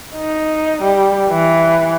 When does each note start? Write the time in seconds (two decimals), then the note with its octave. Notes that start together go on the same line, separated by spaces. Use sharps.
0.16 D#4
0.82 G3
1.30 E3